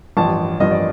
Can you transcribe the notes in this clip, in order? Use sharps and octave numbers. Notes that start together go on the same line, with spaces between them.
A1 G2 F3 A5
A1 G2 F3 D#5
D5